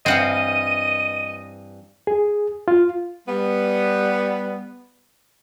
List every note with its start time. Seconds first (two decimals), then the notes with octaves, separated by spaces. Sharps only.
0.06 G2 E3 C4 D#5 F5 F#5
0.31 D#7
2.07 G#4
2.68 F4
3.28 G3 B3